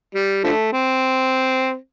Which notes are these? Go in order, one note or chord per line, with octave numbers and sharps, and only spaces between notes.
G3
D3 F3 A3
C4